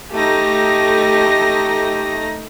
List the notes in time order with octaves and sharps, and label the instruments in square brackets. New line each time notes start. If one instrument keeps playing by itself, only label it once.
[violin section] A3 D#4 A#6 [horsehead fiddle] G4